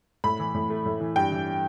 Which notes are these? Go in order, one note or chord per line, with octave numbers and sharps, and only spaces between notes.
A2 B5
E3
A2
A3
A2
E3
G2 G5
E3